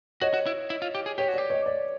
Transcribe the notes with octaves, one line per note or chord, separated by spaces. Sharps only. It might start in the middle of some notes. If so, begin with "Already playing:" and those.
F#4 C#5 D#5
F#4
E4
E4
F4
G4
G#4
G4 C#5
F#4
G4 D5
C#5 D#5
D5